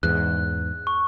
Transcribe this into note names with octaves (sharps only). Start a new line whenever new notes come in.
E2 G#2 F#6
C#6